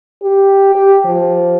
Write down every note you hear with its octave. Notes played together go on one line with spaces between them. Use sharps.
G4
G4
F3